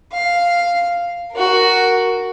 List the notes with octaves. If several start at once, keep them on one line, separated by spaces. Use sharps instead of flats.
F5
F#4 A#4